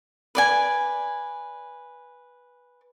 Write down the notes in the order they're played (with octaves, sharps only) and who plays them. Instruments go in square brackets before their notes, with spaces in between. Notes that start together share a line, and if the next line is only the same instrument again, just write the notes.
[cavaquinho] B4 D5 G#5